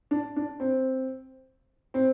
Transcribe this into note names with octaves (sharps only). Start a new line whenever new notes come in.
D4
D4
C4
C4